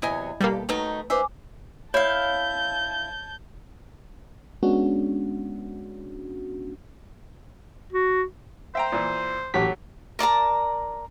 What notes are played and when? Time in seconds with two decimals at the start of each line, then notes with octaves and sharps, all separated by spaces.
0.02 E2 C3 F#3 E4 D#5 G#5
0.41 B2 G3 A#3 G4 A4
0.69 D#3 F#3 A3 D#4 B4
1.10 D#4 B4 C5 E5 G#5 D6
1.94 E4 C#5 F5 A5 G6
4.63 G#3 B3 C#4 D4 F#4
7.93 F#4
8.75 C5 E5 G5 A#5
8.92 A#2 E3
9.54 A1 A2 F#3 G4 B6
10.19 A#4 D5 A5 A#5